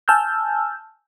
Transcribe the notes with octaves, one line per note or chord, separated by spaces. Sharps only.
G#5 A5 E6 F6 G6